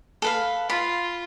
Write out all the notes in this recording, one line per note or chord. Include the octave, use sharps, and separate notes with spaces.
A4 B4 F5
F4 B5